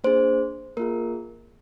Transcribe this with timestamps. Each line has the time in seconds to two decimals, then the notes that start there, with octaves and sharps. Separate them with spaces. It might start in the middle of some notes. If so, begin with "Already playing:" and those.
0.04 A#3 D4 G#4 C5
0.77 A#3 F4 G#4 A#4